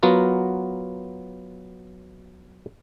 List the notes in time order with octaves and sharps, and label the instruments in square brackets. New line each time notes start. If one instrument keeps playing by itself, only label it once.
[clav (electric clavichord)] F#3 B3 F4 F#4 A#4